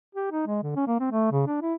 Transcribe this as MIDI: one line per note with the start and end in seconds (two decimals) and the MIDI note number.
0.15 0.28 67
0.32 0.44 63
0.47 0.62 56
0.63 0.72 50
0.76 0.83 61
0.87 0.95 58
1.00 1.08 60
1.12 1.29 57
1.32 1.44 49
1.47 1.61 62
1.62 1.74 64